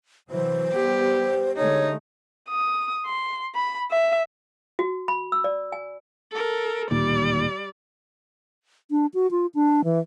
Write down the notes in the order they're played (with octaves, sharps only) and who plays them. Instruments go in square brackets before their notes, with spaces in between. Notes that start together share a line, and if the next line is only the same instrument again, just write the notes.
[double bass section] C3 E3 F#3 [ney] C5
[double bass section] E2 G3 B3 [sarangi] G4
[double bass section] D3 G#3 A3 [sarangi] D#4 [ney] C#5
[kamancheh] D#6
C6
B5
E5
[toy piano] F#4
B5
E6
D5
G#5
[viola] A4 A#4
[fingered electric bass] D1 A#2 D#3 [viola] G3 D5
[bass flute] D4
F#4
F4
D4
E3